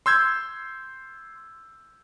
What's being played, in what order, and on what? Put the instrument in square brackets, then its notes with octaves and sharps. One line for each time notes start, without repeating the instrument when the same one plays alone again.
[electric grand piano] C6 E6 G6 G#6